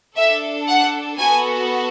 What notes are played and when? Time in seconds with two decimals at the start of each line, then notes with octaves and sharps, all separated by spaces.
0.17 D4 A4 E5
0.68 F#5
1.18 B3 F#4 A4 G#5